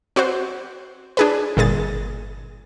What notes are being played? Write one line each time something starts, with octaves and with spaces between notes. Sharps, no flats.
C4 F#4 B4 C5
D4 G#4 B4
G1 A#2 G#4 A6